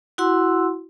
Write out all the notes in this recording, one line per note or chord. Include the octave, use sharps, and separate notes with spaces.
E4 F#4 F#5 C6 E6